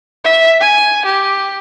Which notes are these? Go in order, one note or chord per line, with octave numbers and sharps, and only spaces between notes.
E5
G#5
G4